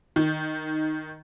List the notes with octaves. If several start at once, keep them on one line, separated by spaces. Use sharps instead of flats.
D#3